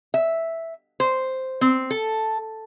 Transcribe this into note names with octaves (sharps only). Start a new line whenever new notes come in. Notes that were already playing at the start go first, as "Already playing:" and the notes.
E5
C5
C4
A4